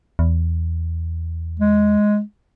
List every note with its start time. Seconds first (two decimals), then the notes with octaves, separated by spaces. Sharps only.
0.19 E2
1.60 G#3